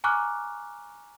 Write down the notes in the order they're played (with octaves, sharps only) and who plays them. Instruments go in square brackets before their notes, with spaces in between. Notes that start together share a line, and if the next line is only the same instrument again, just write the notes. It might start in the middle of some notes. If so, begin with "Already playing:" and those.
[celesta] G#5 A#5 C#6 D6 F6 F#6